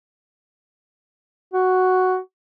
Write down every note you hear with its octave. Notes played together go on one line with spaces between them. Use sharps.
F#4